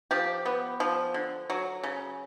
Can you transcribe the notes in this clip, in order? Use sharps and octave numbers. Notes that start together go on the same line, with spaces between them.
F3 G4
B3
F3
D3
F#3
C#3